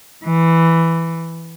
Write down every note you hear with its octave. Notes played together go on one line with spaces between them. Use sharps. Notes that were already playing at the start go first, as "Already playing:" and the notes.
E3